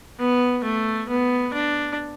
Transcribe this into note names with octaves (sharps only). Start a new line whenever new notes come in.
B3
A3
B3
D4